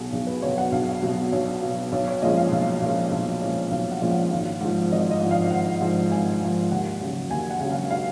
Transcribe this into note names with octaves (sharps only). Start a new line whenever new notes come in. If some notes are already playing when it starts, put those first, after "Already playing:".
Already playing: B1 B2 F#3 G#4
B1 G#4
B4
B2 F#3 C#5
F#5
B1 F5
B2 F#3
B1 C#5
B2 F#3
B1 C#5
C#5
A#2 F3 G#3 C#4 D#5
F5
B1
A#2 F3 G#3 C#4
B1
A#2 F3 G#3 C#4
B1 F5
F#5
A#2 F3 G#3 C#4
F#5
G#1 F5
G#2 F3
G#1 D#5
D#5
G#2 F3
F5
G#1 F#5
G#2 F3
G#1 G#5
G#2 F3
D#2 F#5
C#3 F#3
D#2 G#5
F#5
C#3 F#3
F5
F5